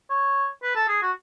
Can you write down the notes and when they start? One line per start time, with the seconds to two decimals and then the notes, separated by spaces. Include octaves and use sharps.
0.10 C#5
0.63 B4
0.76 A4
0.89 G#4
1.02 F#4